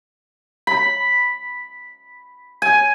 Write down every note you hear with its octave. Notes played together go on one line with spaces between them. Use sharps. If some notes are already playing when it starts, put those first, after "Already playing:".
B5
G#5